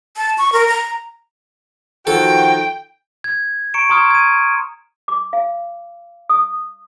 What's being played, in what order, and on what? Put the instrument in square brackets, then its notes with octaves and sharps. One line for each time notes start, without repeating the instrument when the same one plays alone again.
[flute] A5
C#6
A#4
A#5
[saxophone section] D#3 F3 F#4 [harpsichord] A4 [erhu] G5
[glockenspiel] G#6
A#5 C#6 C#7 D7 E7
A#5 C6 C#6 D#6 F6 G#6
G#6 D#7
[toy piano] D6
F5
D#6